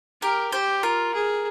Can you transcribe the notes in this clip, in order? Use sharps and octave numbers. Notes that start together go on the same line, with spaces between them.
G4 A#4
G4 C5
F4 A#4
G#4